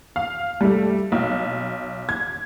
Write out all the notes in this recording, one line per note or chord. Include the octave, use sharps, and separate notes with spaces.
F5
G3 A3
B1
G#6